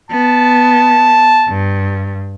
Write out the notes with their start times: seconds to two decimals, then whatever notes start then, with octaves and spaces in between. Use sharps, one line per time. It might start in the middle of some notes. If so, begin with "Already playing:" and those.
0.11 B3 A5
1.48 G2